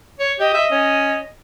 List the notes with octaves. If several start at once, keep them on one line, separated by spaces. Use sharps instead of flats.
C#5
G4 D#5
E5
C#4